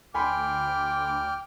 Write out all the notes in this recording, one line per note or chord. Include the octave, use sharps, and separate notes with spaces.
D2 G5 G#5 B5 C6 D6 F6